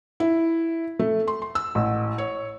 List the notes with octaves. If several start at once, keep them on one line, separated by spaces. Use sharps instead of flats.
E4
A3
C6
C6
E6
A1
C#5